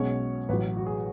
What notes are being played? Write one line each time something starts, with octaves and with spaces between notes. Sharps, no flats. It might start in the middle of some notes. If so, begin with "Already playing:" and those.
Already playing: B1 B2 G#3 C#4 C#5
A1 A2 F#3 B4
F#4
G#4